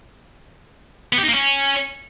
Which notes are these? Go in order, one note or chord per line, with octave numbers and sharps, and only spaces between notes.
B3
G4
D#4
A#3
C#4